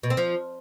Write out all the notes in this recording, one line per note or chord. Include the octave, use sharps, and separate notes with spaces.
B2
C4
F3